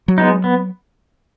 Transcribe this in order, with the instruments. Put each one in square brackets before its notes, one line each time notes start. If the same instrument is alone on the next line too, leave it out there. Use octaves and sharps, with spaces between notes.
[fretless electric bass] F#3
[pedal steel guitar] G#3 B3 D#4
B3